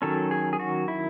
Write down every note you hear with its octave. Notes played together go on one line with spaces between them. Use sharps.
D#3 F#3 C#4 A4
G#4
G#4
F#4
E4